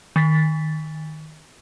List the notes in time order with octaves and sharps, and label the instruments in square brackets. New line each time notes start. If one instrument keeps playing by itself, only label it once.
[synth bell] D#3 A6 B6